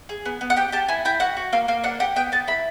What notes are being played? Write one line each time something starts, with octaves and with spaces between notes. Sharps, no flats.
G#4
B3
B3
F#5
G4 G5
G4 A5
E4 G#5
E4 G5
F#4 F#5
F#4
A#3 F5
A#3 F5
D4 F#5
G4 F#5
B3 G5
B3 A5
E4 B5